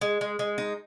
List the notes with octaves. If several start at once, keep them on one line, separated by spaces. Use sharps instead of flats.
G#3
G#3
G#3
D#4